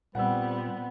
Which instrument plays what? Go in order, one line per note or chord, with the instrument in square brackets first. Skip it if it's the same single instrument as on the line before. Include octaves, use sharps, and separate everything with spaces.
[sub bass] A#2 [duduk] G3 [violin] B3 C4 [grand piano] F#5 E6